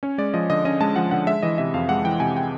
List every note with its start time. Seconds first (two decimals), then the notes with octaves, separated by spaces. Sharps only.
0.03 C#4 C#5
0.18 G#3 D5
0.34 F3 D#5
0.50 D3 D#5
0.65 C#4 D#5
0.81 G#3 A5
0.96 F3 F#5
1.11 D3 F#5
1.27 G#3 E5
1.43 E3 D#5
1.58 C3 E5
1.74 F2 F5
1.89 G#3 F#5
2.05 E3 G5
2.20 C3 G#5
2.36 G5